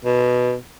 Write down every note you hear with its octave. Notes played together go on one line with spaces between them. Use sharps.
B2